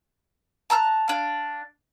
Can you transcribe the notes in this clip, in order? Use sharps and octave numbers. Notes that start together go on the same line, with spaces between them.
A5 A#5 E6 F#6
D4 F5